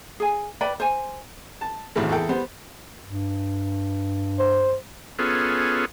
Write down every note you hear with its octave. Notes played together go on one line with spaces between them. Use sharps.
G#4 G#5
B4 D5 G5 B5
C5 G#5
A5
G#1 A2 C3 E3 A3
E2 E4 G#4 A4 G5
G3 B3 C5
G2
C5
B3 C#4 F4 G#4 A4